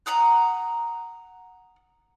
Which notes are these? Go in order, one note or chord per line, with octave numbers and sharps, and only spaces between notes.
F#5 A#5 D#6 F#6